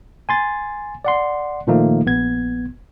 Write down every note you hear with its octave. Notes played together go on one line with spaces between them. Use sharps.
G#5 C6 A6
D5 F#5 C6
A#2 D#3 F3 A3 A#3 D#4
A#1 B3 G#6